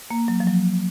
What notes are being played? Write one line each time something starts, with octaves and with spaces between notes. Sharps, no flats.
A#3
F#3
F3
F#3